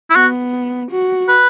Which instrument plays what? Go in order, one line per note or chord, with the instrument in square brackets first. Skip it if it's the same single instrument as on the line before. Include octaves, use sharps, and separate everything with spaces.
[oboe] E4
[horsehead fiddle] B3 [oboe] F#4
[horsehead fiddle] F#4
[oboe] B4